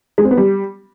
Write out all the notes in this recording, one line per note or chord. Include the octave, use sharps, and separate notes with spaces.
G#3
C4
B3
G3